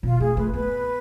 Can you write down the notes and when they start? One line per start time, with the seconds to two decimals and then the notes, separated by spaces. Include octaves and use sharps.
0.03 B2 F4
0.20 A3 G#4
0.37 A3 B4
0.54 B3 B4